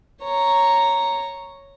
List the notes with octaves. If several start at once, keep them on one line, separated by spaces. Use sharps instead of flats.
C#5 A#5